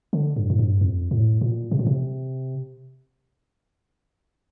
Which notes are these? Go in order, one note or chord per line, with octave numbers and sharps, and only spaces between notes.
D3
G2
A2
G2
F2
A2
A#2
C3
A#2
C3